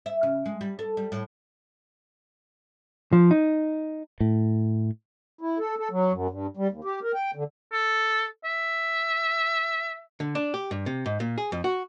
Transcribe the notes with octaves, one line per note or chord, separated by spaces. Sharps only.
E5
C#3
G#3
G3
A4
G3
A2
F3
D#4
A2
E4
A4
A4
F#3
F#2
G2
G3
D#2
G4
A#4
G5
D3
A4
E5
D3
D4
G4
G2
C3
G#2
A#2
G#4
F2
F#4